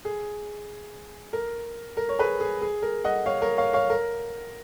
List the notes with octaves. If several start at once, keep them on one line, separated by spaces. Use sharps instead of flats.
G#4
A#4
A#4
C#5
G#4 B4
G#4
G#4
A#4
D#5 F#5
C#5 F5
A#4 C#5
C#5 F5
C#5 F5
A#4